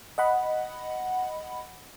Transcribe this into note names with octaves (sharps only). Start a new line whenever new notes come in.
D#5 F#5 B5